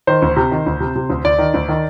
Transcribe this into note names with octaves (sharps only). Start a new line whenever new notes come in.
D#3 C5
D2
C3
D#3
D2
C3
C3
D2
D2 D5
D#3
D2
D#3